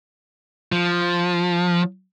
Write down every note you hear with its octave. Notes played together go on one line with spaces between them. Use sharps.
F3